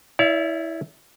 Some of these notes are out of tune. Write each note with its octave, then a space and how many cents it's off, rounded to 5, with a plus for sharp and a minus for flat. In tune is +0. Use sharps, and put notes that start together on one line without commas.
E4 -15 D5 -45 F5 -45